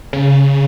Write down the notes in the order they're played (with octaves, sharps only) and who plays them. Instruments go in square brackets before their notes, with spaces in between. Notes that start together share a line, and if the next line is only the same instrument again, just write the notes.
[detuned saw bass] C#3